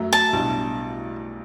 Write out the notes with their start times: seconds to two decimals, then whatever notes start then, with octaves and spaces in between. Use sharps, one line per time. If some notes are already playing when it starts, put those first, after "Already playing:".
Already playing: F#2 F#3 A3
0.13 A5
0.33 B1 A2 G3 D4